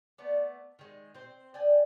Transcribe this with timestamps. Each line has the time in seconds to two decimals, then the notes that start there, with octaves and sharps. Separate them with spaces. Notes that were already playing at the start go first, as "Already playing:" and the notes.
0.18 A3 B3 D5
0.79 D#3 G#3
1.14 C4 C5
1.54 D5 D#5 G5 G#5